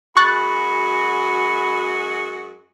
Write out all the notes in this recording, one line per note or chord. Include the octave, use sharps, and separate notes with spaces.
F#2 G#3 F#4 B5 C#6 F#6 A6